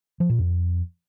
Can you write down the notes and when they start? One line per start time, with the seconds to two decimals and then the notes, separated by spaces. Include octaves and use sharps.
0.20 F3
0.29 A#2
0.39 F2